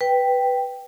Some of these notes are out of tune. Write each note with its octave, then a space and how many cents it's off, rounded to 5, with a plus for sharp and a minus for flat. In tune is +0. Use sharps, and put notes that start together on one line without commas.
B4 +0 G5 +0